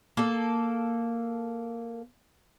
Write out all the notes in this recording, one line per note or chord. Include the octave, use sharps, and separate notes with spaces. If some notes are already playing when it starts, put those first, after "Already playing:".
A#3 A4